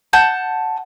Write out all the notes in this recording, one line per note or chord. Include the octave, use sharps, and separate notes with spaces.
F#5 A5 G6